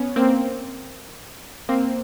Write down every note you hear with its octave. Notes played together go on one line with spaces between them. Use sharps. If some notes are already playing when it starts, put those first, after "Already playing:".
Already playing: B3 C#4
A#3 C4
A#3 C4